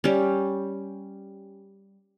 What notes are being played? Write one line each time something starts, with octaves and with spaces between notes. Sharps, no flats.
G3 C#4